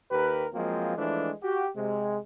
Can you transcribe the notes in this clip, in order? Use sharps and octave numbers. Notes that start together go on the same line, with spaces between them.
D#2 G4 A#4 B4
F3 F#3 G#3 A#3 C4
E3 F3 G#3 A3 D4
F#4 G4
C3 G#3